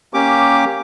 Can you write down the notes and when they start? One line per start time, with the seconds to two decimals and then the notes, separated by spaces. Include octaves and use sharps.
0.14 A#3 C#4 G4 D6